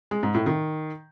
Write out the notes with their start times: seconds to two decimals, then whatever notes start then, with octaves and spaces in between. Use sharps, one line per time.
0.11 G#3
0.23 G#2
0.35 A2
0.46 D#3